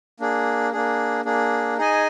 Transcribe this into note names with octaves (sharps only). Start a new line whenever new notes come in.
A#3 D4 G#4
A#3 D4 G#4
A#3 D4 G#4
D#4 G#4 D#5 G#5